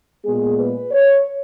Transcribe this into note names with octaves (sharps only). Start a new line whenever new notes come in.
A#2 G#3 B3 G#4
B4
C#5